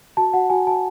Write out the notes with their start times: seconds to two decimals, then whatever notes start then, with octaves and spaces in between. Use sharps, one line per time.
0.17 F#4 A5
0.33 F#4 F#5
0.50 F#4 G#5
0.67 F#4 A5